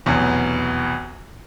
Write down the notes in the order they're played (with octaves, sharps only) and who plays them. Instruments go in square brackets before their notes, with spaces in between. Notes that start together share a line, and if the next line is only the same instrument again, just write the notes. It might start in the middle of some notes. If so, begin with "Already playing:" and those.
[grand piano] F1 B1 E2